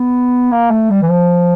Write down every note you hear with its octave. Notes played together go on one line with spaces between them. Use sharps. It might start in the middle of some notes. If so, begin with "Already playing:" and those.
Already playing: B3
A#3
A3
G3
E3
F3